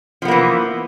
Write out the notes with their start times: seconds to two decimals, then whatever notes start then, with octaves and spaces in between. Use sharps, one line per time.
0.22 F3
0.25 B3
0.28 A#3
0.31 E3